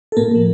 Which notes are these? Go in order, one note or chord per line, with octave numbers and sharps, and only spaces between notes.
A4
A2 A#3 A#4
F3 A#3